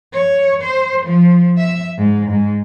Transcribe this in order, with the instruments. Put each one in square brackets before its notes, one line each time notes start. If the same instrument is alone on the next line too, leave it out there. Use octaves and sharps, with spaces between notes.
[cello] C#5
C5
F3
E5
G#2
G#2